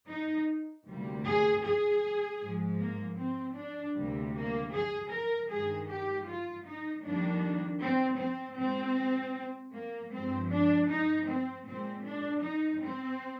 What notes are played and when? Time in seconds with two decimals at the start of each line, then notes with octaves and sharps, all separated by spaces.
0.09 D#4
0.86 D2 C3 G3 A#3
1.25 G#4
1.63 G#4
2.40 G#2 F3 G#3
2.79 A#3
3.18 C4
3.56 D4
3.94 D2 C3 G3 A#3
4.33 A#3
4.71 G#4
5.10 A#4
5.48 G2 D#3 G#3 G#4
5.87 G4
6.25 F4
6.64 D#4
7.03 F2 D#3 G3 A#3 D4
7.80 C4
8.19 C4
8.56 A#2 G#3 C4
9.73 A#3
10.11 G2 F3 G#3 C4
10.49 D4
10.88 D#4
11.27 C4
11.64 A#2 G#3 C4
12.04 D4
12.42 D#4
12.81 C4